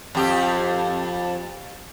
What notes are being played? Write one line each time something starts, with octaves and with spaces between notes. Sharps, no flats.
F2 G4